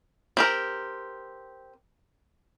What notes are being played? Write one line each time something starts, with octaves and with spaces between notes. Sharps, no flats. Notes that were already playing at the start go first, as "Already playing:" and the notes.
C4 G4 A#4